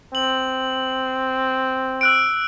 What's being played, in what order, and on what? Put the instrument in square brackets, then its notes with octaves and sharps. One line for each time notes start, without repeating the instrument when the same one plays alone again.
[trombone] C4 [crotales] F#7
[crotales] E6 F#6 D7